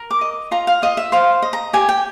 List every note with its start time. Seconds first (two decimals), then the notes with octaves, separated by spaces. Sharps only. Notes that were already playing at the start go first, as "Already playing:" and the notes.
Already playing: A#4
0.11 D6
0.21 D#5
0.51 F4 A#5
0.67 F5
0.82 F4 D#5
0.97 E5
1.12 C5 F5
1.42 D#5
1.53 A#5
1.73 G4 G#5
1.89 G5